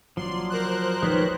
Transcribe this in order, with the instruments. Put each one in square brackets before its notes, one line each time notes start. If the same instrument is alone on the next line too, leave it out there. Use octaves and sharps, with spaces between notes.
[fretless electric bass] F#1 [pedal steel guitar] F3 F#3 D5 [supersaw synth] C6
[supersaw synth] A#4 C5 F#6
[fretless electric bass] F1 A#1 F3 [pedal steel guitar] G#3 C#5 G5 [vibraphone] D#4 B4